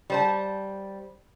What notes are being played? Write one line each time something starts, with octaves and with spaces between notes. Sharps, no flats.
G3 C5 A5